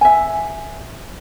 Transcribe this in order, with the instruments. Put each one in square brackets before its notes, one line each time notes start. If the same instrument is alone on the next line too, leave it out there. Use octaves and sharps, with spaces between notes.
[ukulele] E5 G#5